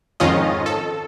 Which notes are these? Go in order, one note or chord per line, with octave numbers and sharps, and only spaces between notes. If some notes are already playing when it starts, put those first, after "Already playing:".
F2 G#2 D#3 C#4 F4 D#5
A4